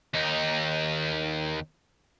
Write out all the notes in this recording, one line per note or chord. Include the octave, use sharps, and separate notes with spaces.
D#2 D#4